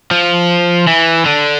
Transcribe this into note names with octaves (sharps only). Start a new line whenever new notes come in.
F3
E3
D3